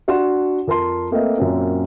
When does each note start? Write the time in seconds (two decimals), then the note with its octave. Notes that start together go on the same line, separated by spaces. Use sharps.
0.08 D4 F#4 F#5 C6 E7
0.67 F2 A#4 A5 C6
1.11 A3 A#3 C4 B4 D#5 E5
1.38 F#2 A#2 A#3 C4 C#4